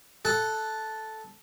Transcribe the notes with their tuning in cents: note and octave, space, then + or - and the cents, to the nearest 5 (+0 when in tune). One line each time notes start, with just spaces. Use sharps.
A4 -5 F#5 +0